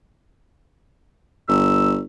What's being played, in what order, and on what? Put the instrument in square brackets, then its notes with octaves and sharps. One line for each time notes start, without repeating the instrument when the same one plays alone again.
[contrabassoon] G1 [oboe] E6